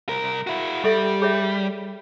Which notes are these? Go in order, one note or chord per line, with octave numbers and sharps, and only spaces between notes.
C2 A#4
E4 F#4
G3 G4 A4 E5
G#4 C#5 E5